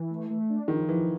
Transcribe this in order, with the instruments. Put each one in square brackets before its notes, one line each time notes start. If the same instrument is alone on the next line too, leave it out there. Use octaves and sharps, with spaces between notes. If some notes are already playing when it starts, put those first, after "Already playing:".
Already playing: [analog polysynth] E3
A3
A3
D4
[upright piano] D#3 [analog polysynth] F3
[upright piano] E3 [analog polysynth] F3